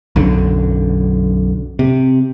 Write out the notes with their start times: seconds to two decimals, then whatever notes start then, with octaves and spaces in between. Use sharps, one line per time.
0.16 B1 F#2 D3
1.79 C3